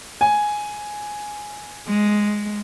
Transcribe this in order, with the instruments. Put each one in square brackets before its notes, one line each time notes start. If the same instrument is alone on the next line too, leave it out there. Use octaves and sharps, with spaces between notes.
[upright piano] G#5
[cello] G#3